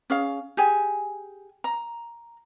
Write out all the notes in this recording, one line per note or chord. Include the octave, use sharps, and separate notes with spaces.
C#4 G#4 F5
G4 G#4 G#5
A#5